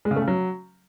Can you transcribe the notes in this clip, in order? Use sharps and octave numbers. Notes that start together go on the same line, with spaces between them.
G#3
C#3
A3
C#3
F#3